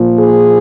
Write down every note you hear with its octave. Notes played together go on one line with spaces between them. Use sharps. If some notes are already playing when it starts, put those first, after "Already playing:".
Already playing: A#2 F3
G#4